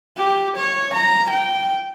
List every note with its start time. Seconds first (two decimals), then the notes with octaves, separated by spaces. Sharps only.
0.17 G4
0.57 C#5
0.94 A#5
1.30 G5